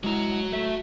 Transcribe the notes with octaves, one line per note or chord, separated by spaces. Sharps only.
G#3 E4 F#4 A#5
A3 E5